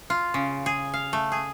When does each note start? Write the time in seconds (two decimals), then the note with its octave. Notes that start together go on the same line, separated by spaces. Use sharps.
0.10 F4
0.34 C#3
0.66 G#4
0.94 F5
1.13 A3
1.32 G#4